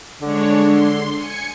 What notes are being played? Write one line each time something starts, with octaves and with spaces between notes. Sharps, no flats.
D3 G#3 D4 C#5
C6
G#5 C#7